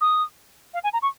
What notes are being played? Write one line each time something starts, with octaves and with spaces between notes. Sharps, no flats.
D#6
F5
G#5
A#5
C#6